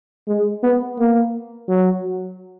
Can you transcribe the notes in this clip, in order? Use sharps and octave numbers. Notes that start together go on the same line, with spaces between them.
G#3
B3
A#3
F#3